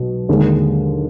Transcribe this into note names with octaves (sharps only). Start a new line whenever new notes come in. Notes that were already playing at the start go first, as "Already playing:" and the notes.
Already playing: B1 B2 F#3
D#2 D3 G#3 D4 G#4